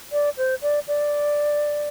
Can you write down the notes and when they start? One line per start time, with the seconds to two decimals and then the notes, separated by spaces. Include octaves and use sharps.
0.12 D5
0.37 C5
0.62 D5
0.88 D5